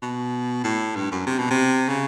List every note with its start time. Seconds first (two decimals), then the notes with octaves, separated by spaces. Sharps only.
0.02 B2
0.64 A2
0.96 G2
1.11 F#2
1.27 C3
1.38 B2
1.51 C3
1.89 C#3